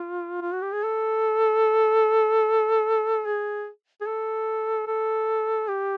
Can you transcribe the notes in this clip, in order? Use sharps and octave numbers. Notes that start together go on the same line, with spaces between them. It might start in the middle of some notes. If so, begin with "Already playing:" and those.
Already playing: F4
F4
F#4
G4
G#4
A4
G#4
G#4
A4
A4
G4